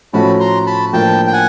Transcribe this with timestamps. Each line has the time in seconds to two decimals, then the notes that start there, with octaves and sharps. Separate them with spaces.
0.13 A2 F3 A3 C#4 F#4 A5 B5
0.40 A#5 C6
0.67 A5 B5
0.93 A2 F3 A#3 D4 G5 A5
1.27 G5
1.33 F#5 G#5